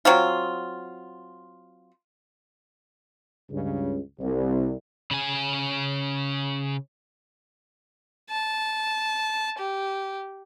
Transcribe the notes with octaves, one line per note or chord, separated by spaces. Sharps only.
F#3 C4 F4
C#2 G2 C#3
C2
C#3 G#5
A5
G4